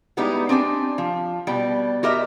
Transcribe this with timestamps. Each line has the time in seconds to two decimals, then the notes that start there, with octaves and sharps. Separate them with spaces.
0.17 G3 G#3 B3 D#4 E4 G4
0.49 C4 D4 G4 G#5
0.98 F3
1.47 B2 G3 G5
2.03 F#4 G4 A#4 D#5 E5